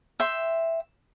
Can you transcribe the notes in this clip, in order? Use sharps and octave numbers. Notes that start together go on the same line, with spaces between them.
E5 G5 C6